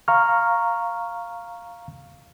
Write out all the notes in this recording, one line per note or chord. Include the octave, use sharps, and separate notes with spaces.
F5 A#5 C#6 F6